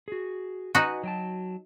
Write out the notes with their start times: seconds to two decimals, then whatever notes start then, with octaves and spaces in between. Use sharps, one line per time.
0.08 F#4 G#4
0.75 D#4 F#4 B4 F#5 G#5
1.03 F#3 G5 A5